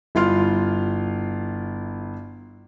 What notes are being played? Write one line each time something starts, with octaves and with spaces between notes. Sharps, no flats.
G1 E4 F4 C6 F6